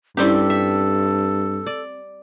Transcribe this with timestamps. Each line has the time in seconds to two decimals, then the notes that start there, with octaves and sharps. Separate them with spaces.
0.17 G2 G3 C4 C#4 E4 G4 A4
0.50 E5
1.67 D5